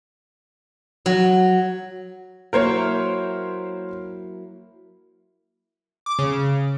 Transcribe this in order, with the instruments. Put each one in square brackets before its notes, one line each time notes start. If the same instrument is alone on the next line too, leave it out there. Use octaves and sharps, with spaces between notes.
[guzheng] F#3
[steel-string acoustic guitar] F#3 A#3 E4 [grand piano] A#4 C5 C#5
[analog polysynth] D6
C#3